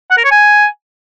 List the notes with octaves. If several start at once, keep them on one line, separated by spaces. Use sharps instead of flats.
F#5
A#4
C#5
G#5